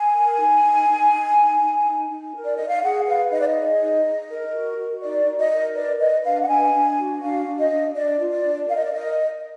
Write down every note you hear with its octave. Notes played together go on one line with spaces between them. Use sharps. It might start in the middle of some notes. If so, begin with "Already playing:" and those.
Already playing: G#5
A#4
D#4
D#4
D#4
D#4
D#4
D#4
D#4
D#4
A#4
D5
D#4 D#5
F5
G#4 F#5
B4 F5
D#4 D#5
D5
D#5
G#4
D#4
D#4
A#4
F#4
F#4
D#4 D5
D#4
D#5
A#4
B4 D5
B4 D#5
D4 F5
F#5
D4 G#5
D4
F#4
D4 F5
D4
D#5
D4
D4 D5
F4
D5
D4
A#4 F5
D#5
D5
A#4 D#5